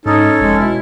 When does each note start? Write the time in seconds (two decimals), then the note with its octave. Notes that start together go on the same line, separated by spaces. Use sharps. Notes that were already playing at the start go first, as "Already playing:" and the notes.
0.06 G#2 C#4 D#4 A4
0.40 F1 G#3
0.60 B2 E4